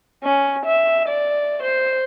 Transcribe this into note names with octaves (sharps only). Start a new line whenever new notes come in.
C#4
E5
D5
C5